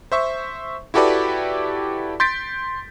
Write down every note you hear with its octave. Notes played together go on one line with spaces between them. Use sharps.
C5 E5 C#6
E4 F#4 G4 A4 B4 D5
C6 G6 A6 B6 D7